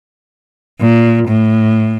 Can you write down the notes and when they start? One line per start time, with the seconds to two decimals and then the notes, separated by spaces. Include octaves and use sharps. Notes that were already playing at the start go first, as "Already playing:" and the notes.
0.81 A#2
1.28 A2